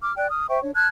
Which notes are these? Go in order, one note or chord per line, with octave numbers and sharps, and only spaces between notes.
D6 F6
D5 G5 F#6
D#6 F6
C5 E5 G5 C#6
D4 C#5
A5 F6 F#6 G#6